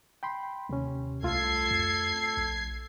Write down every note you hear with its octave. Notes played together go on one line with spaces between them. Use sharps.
G5 B5 C6
D#2 C3 C#4
C2 A3 F4 A4 G#6 C7
F2
A#1